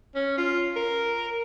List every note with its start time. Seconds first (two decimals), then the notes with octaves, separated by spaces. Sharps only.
0.15 C#4
0.37 F4
0.76 A#4